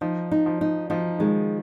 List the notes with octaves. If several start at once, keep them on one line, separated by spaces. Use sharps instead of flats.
F3 D#4
D#4
F3
D#4
F3 D#4
D#3 G#3